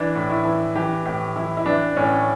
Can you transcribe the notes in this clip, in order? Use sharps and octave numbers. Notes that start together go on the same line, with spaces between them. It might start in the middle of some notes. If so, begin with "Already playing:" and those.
Already playing: E3 D4
A2
E4
E3
E3 G4
A2 G4
E3 E4
E4
E3 D4
A2 C#4